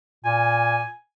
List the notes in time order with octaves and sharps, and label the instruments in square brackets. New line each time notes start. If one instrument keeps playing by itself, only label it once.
[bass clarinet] A#2 [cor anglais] G#5